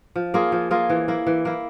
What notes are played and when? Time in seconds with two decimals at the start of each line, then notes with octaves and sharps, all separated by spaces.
0.16 F3
0.34 A#3 F4 G#4
0.52 F3
0.71 A#3 F4 G#4
0.90 E3
1.08 A#3 E4
1.27 E3
1.45 A#3 E4